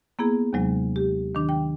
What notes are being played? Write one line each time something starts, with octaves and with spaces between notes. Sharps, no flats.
A#3 B3 E4 G#4
D#2 C3 F#3 G#3
G4
D#3 D4 D6
G5